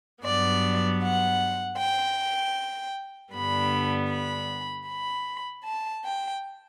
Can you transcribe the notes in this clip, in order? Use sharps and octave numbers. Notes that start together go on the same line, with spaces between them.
G2 F#3 B3 D5
F#5
G5
G2 D3 G3 B3 B5
B5
B5
A5
G5